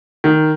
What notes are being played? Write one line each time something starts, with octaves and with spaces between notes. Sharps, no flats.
D#3